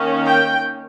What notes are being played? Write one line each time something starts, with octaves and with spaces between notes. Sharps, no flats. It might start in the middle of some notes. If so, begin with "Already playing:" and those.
Already playing: D#3 A#3 C#4
G5